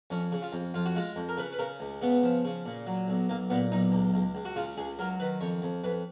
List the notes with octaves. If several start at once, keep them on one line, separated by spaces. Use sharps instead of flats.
F2 C#4
C#3
F4
F2
F2 F4
F#4
G#3 F4
F2
A#4
C#3 B4
B4
C#3 A#4
C#2
C#3 B3
F3
C#3
A#2
F#3
B1
B1 A#3
A#2 B3
B1 D#4
C#2
C#2
C#2
F#4
C#3 F4
C#2 G#4
F#3 A#4
D#3 B4
F2 C#5
F2
F2 B4